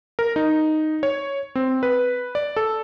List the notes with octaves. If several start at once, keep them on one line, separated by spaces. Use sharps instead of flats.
A#4
D#4
C#5
C4
B4
D5
A4